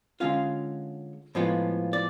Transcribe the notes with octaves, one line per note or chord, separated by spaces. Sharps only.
D3 G#3 C#4 F4 F5
A2 F3 G#3 B3 F4
D5